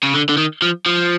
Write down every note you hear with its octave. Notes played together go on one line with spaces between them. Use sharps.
C#3
D3
D3
D#3
F3
F3